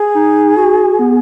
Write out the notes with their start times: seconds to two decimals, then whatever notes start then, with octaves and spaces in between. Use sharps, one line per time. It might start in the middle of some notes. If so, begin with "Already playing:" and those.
Already playing: G#4
0.15 D#4
0.57 F#4
0.99 B3